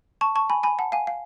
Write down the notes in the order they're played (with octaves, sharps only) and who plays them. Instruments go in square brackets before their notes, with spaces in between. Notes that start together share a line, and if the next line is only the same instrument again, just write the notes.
[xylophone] A5 C#6
A5 C#6
G#5 B5
G#5 B5
F#5 A5
F5 G#5
F5